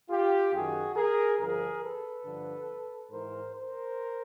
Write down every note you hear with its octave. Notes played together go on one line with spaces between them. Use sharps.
F4 G4
F#2 D#3 F#4 G#4
G#4 A#4
G2 D3 F3 G#4 A#4
A4 B4
G2 D3 F3
G#2 E3 A#4 C5
A#4 C5